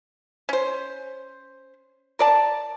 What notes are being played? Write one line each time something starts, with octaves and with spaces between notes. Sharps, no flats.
C#4 C5
A#4 D5 A5